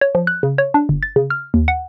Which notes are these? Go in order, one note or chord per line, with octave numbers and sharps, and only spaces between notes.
C#5
F3
F#6
C#3
C#5
D4
G1
A6
C#3
F6
D#2
F#5